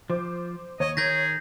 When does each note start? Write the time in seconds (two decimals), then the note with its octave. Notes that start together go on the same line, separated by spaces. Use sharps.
0.10 F3 C5 D6
0.80 D#2 C#5 D#5
0.97 D#3 G#4 A#4 G6 G#6 A#6